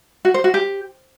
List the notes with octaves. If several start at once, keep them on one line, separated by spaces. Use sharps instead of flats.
F#4
C5
F#4
G4